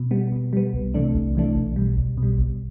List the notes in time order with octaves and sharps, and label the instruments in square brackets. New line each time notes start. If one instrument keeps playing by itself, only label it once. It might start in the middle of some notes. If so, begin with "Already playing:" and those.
Already playing: [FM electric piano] B2
G3 B3
B2
G3 B3
C2
C3 E3 A3 D4
C2
C3 E3 A3 D4
B1
B2 G3
B1
B2
G3
B1